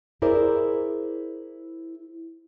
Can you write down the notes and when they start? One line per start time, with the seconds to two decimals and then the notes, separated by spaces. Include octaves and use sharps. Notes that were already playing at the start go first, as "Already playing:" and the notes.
0.22 E4 G#4 A#4 C5 D5